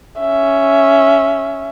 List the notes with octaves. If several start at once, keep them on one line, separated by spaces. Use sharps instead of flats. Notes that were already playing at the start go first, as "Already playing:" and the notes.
C#4 E5